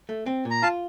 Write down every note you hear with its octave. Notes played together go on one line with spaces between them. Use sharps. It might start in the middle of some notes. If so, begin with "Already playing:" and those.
A3
C4
A#2
A#5
F4 F5 A5